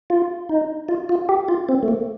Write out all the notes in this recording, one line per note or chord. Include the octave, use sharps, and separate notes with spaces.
F4
D#4
F4
F4
G4
F4
C4
A3
A#3